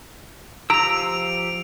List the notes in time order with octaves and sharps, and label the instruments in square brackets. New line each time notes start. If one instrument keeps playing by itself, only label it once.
[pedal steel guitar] F3 G4 E6 [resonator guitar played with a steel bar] A#5 [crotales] D7 F7